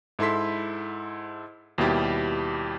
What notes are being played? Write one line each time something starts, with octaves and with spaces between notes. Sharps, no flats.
G#2 E4 A4 C6 B6
D#2 B2 G3 E4 G4 A6